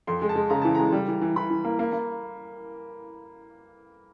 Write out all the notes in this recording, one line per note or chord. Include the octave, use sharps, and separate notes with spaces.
F2 C6
G#3
A5
G#3
C#3 A#5
E3 A5
G#3 A#5
G3
E3
E3
E3 B5
E3
A#3
A#3
A#3